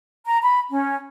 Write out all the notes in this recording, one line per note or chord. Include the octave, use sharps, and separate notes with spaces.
A#5
B5
C#4